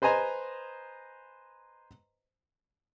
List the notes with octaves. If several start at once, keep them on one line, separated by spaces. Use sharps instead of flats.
B4 C5 D#5 G#5 A#5 C6